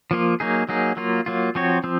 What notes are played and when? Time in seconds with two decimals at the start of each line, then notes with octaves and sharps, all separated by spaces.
0.11 F3 A#3 F4
0.40 F#3 A#3 D#4 G#4
0.69 F#3 A#3 D#4 G#4
0.97 F#3 A#3 F4
1.26 F#3 A#3 F4
1.55 F3 C4 F#4 C#5
1.84 F3 C4